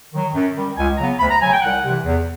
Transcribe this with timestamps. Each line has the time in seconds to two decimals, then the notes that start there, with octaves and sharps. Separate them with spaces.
0.12 D#3 F#3
0.34 F#2
0.55 D#3 G3
0.77 C#2 G#5
0.98 C#3 F#3 B3 A#5
1.19 D2 B5
1.30 A#5
1.40 C#3 F#3 G#5
1.52 G5
1.62 C2 F#5
1.83 C3 E3
2.05 E2